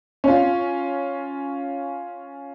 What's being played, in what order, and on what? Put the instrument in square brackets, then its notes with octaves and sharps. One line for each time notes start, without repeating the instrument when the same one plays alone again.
[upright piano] C#4 F4